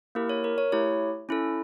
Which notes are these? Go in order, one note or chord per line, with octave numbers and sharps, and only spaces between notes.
A#3 E4 G4 A#4
C#5
A#4
C#5
A3 E4 G4 C#5
C#4 E4 A4